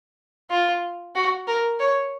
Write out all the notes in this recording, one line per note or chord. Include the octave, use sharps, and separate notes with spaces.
F4
F#4
A#4
C#5